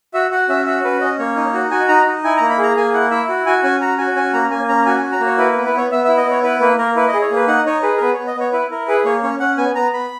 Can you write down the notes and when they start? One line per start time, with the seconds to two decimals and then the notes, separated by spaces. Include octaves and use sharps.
0.14 F#4 E5
0.31 F#4 F#5
0.49 C#4 E5
0.66 F#4 E5
0.84 C#4 B4
1.01 C#4 D#5
1.19 A#3 C#5
1.36 D#4
1.54 F#4
1.71 F#4 G#5
1.88 D#4 A#5
2.06 D#4
2.24 E4 G#5
2.37 A#3 A#5
2.49 B5
2.58 G#4
2.63 A#5
2.77 A#3 G#5
2.93 E4 F#5
3.11 E4 E5
3.29 F#4
3.46 F#4 G#5
3.63 C#4 G#5
3.81 F#4 A#5
3.98 F#4 G#5
4.16 C#4 G#5
4.33 A#3 A#5
4.51 A#3 G#5
4.68 C#4 A#5
4.86 F#4 G#5
4.99 G#5
5.03 F#4
5.12 A#5
5.20 A#3
5.26 C#5
5.38 E4 B4
5.52 B4
5.56 B3
5.65 B4
5.73 B3 C#5
5.91 B3 E5
6.04 E4 E5
6.17 D#5
6.26 B3 C#5
6.43 E4 B4
6.61 A#3 B4
6.78 A#3 A#4
6.95 E4 B4
7.08 D#5
7.14 G#4
7.22 C#5
7.31 A#3 B4
7.48 D#4 F#5
7.65 D#4 C#5
7.83 G#4 B4
7.97 A#4
8.01 B3 B4
8.13 C#5
8.17 B3
8.27 D#5
8.36 B3 C#5
8.52 E4 B4
8.71 E4 A#4
8.88 G#4 B4
9.05 A#3 C#5
9.22 C#4 C#5
9.40 C#4 F#5
9.57 B3 G#5
9.75 B3 A#5
9.92 B3 B5